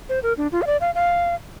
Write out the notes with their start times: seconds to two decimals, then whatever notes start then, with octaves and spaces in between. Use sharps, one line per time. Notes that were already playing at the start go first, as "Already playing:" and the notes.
0.09 C5
0.23 A#4
0.37 D4
0.52 F4
0.62 F5
0.67 D5
0.81 F5
0.95 F5